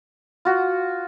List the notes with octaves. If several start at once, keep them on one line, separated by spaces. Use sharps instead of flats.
F4 F#4